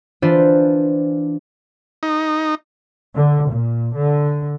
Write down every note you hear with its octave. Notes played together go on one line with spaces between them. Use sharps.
E3 D4 F4 B4 C5
D#4
D3
A#2
D3